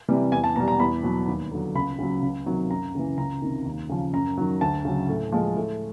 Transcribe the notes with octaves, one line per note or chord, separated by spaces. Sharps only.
C3 E3 G3
E2 G#5
A5
B2 G3 A#5
A#5
E2 B5
B2 F#3
D#2
D3 F#3
C#2 B5
C#3 F#3
C#2
C3 D#3 F#3
F#2 A#5
C#3 E3
C#2 A#5
C3 D#3
D#2
C#3 F3
F#2 A#5
D#3 F#3
D2 A5
C#3 F#3
A2
F3 G#3
A2